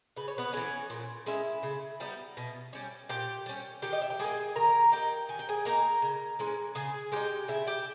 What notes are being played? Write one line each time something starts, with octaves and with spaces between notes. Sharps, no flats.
C#3 B4
C#5
B3 B4
E3 G#3 C#4 C#5
A#2
G#3 C#4 E4 E5
C#3
G3 B3 D#4
B2
G3 C#4
A#2 G4 G5
G3 C#4
D#3 G4 G5
D#5
E5
G5
G3 A#3 G#4 G#5
D#3 A#4 A#5
A#3 D#4 G4 G5
D#3 G#5
G5
G#4 G#5
A#3 D#4 A#4 A#5
C#3
E3 G#3 C#4
C#3 G#4 G#5
G#3 D#4 G4 G5
C#3 E4 E5
G4 G5